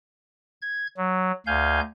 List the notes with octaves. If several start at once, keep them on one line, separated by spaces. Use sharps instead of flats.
G#6
F#3
D2 F5 G#5 G6